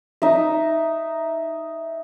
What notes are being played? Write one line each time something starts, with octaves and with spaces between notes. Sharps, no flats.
D#4 E5